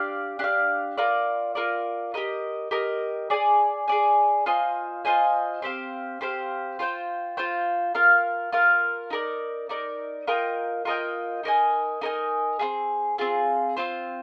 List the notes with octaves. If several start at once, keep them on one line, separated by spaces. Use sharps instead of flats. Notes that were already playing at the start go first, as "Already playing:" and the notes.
Already playing: D4 G4 D5 F5
D4 G4 D5 F5
F4 A#4 D5
F4 A#4 D5
G4 A#4 D#5
G4 A#4 D#5
G#4 D5 G#5
G#4 D5 G#5
F4 C5 D#5 G#5
F4 C5 D#5 G#5
C4 G4 C5 F5
C4 G4 C5 F5
F4 C5 G5
F4 C5 G5
F4 A#4 F5
F4 A#4 F5
D#4 A#4 D5
D#4 A#4 D5
F4 A#4 D#5 G5
F4 A#4 D#5 G5
D#4 A#4 D#5 G#5
D#4 A#4 D#5 G#5
C4 F4 G#4
C4 F4 G#4
C4 F4 C5